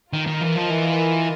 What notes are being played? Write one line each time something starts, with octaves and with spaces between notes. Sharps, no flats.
D#3 F4 A#4 D#5
D#3
E3
F3
E3